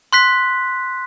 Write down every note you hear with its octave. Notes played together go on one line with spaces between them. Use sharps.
C6 F#6 B6